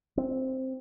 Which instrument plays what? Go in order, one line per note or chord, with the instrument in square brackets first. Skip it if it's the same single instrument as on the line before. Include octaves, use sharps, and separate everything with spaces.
[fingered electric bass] C4